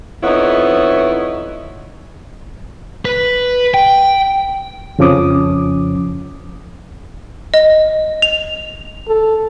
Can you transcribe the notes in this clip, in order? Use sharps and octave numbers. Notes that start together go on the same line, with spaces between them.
F2 B3 D#4 E4 C#5
B4
G5
F2 C#3 F3 C#4 D6 D#6
D#5
F7
A4